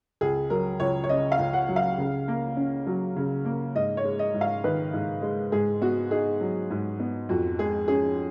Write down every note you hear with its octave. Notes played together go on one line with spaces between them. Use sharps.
C#2 G#4
F#3 A#4
C#2 C#5
C#5
C#3 D#5
F5
C#2
F#5
F#3
F5
C#3
A#3
C#4
F#3
C#3
A#3
G#2 D#5
C#5
G#3
D#5
G#2
F5
D#3 B4
G#2
G#3
G#2 G#4
B3 F#4
D#4 G#4
F#3
G#2
B3
F2 F#4
G#3 G#4
C#4 G#4